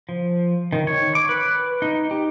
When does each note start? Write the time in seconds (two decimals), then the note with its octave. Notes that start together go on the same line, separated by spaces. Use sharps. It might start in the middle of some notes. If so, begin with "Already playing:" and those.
0.09 F3
0.73 D#3
0.87 C#5
1.15 D6
1.29 B4
1.82 D#4
2.11 G4